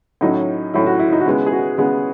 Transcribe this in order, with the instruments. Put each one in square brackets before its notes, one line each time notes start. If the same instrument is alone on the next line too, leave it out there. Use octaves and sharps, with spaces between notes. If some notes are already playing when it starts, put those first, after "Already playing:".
[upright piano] A2 F#3 C#4 D#4
A2 F#3 C#4 E4
F#4
E4
D#4
F#4
C#3 G#3 B3 E4
G#4
F#4
C#3 G#3 B3 G#4